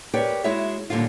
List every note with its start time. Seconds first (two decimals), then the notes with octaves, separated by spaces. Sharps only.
0.14 G4 A#4 B4 C#5 D5 G5
0.44 G#3 E4 F#4 G#4 C#5 E5
0.90 D#2 A#2 D3 G3 F4